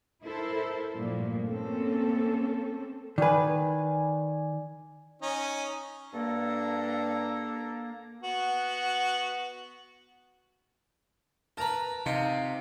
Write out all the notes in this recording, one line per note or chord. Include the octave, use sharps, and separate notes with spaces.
E4 A4 A#4 C5
G2 A#2 F3 A3 A#3
A#3 C4 C#4 A4
D#3 B4 D5 G#5
C#4 D#4
G2 A#3 D4 A4 A#5
B3 F#4
A#4 B4 A5 A#5
C3 D#4 F4